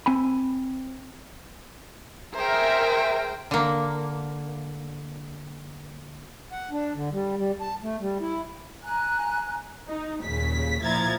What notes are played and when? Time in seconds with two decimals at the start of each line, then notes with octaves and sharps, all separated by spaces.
0.06 C4 G#5 B5
2.35 G#4 A#4 C5 E5 G5
3.51 D3 A#3
6.52 F#5
6.71 D4
6.94 D3
7.12 G3
7.37 G3
7.61 A5
7.83 A3
8.00 G3
8.21 E4
8.84 G#5 A#5 F#6
9.88 D#4
10.24 D#2 A#2 C#3 B6
10.83 A#2 F3 E4 A#5 G#6 A6